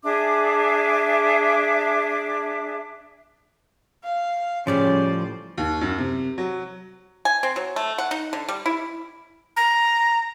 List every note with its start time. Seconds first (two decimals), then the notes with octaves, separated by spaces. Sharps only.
0.03 D4 G#4 E5 D6
4.04 F5
4.67 A2 C#3 F3 G3 C#4 C5 D5
5.58 D#2
5.81 F#2
5.98 C3
6.38 F#3
7.25 G#5
7.43 C4
7.56 F#3
7.76 A3
7.98 F#5
8.11 D#4
8.33 D3
8.48 G3
8.66 E4
9.57 A#5